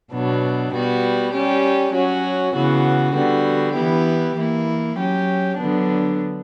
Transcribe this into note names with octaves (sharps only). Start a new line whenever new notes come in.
B2 F#3 B3 D4
G3 B3 F#4
G3 C#4 G4
F#3 C#4 F#4
C#3 E3 B3 F#4
D3 G3 B3 F#4
E3 B3 E4 G4
E3 A#3 E4
F#3 C#4 G4
D3 F#3 B3 D4